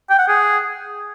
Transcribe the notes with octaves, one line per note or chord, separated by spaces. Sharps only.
G5
F#5
G#4